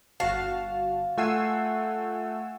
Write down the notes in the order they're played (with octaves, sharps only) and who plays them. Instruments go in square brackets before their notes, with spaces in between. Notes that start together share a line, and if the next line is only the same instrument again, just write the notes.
[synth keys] G1 F#4 A5 [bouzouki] F5
[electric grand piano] A3 F#5 C7 [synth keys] F4 G#5 E6